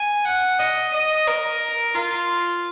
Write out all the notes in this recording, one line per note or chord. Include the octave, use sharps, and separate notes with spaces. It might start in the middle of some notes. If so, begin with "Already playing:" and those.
Already playing: G#5
F#5
D#5
D#5
A#4
F4